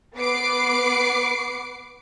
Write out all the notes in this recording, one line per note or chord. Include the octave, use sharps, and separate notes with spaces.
B3 B4 D6 C7 D7